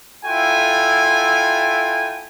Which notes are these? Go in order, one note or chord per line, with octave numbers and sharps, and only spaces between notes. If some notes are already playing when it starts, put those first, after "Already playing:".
E4 F4 A4 G5 G#5